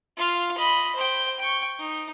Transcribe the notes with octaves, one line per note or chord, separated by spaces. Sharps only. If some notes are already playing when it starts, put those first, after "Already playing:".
F4 F5
D#5 B5
C5 G5
G5 C#6
D#4